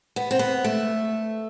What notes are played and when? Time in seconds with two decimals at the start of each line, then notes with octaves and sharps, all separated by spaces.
0.16 B3
0.31 C4
0.39 B3
0.64 A3